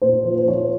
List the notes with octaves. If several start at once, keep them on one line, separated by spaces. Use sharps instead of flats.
A#2 C5
F3
C5
F3 C#5